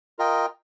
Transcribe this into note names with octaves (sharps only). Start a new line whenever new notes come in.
F4 A#4 D#5 G5